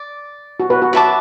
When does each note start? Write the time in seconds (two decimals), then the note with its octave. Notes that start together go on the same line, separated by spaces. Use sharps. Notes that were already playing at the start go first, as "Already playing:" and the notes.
Already playing: D5
0.60 F#4
0.70 F#4 B4
0.82 F#4
0.93 F#4 B4 E5 A5 D6